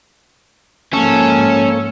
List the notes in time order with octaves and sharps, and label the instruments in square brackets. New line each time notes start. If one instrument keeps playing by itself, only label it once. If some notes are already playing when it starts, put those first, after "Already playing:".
[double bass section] G#2 F3 [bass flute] A#3 [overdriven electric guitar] C#4 [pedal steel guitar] A4